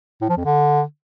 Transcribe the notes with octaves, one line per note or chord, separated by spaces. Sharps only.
A2
F3
F2
D3